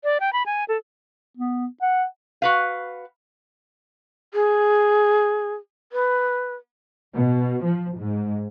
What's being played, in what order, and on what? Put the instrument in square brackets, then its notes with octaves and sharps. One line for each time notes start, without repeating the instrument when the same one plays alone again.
[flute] D5
G5
B5
G#5
A4
[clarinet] B3
F#5
[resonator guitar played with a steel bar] F#4 B4 F5
[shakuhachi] G#4
B4
[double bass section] B2
F3
G#2